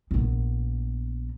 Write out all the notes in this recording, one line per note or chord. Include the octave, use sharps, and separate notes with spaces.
A#1 B3